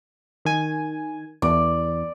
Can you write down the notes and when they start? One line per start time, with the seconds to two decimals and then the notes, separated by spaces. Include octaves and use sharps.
0.45 D#3 G#5
1.42 E2 D5